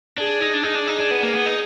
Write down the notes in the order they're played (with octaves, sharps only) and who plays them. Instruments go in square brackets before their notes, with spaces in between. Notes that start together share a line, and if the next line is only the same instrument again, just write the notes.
[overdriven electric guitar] D4 [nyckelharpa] G#4
[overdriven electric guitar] D#4
D4
[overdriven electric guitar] D#4 [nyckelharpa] G#4
[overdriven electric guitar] D4
D#4
D4
B3
A#3
B3
D#4